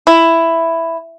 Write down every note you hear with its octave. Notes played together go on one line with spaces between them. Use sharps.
E4